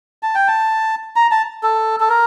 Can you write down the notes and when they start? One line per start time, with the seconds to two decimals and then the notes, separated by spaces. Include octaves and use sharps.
0.23 A5
0.35 G5
0.48 A5
1.16 A#5
1.31 A5
1.63 A4
2.00 A4
2.09 A#4